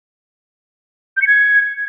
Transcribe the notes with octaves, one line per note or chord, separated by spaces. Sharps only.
G6
C#7
G#6